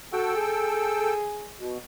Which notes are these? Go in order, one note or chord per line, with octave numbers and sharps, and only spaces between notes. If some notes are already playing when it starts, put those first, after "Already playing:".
F#4 A4 G5 E6
G#4
B2